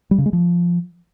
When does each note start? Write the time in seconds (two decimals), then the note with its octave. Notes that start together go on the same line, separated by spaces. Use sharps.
0.11 G3
0.18 C#3
0.26 G#3
0.33 F3